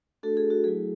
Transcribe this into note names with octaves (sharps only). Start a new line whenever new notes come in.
A3 D4 F#4 A4
G#4
F#4
F#3 A3 E4 G#4